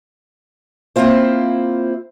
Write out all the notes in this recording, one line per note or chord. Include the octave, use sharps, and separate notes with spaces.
A#3 C4 E4 F4 C5